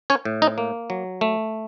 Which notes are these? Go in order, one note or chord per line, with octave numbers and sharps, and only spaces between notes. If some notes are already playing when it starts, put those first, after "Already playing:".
C#4 C#5
A2
D#4 D#5
A#3
F#3
A3